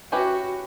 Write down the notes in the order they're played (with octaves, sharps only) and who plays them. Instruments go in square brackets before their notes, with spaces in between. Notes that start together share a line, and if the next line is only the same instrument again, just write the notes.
[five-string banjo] C#4 E4 G4 B4 [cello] F#4